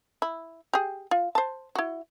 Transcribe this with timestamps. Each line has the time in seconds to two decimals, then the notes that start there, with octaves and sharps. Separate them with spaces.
0.22 E4
0.74 G4 G#4
1.11 F4
1.35 C5 A5
1.75 E4 F#4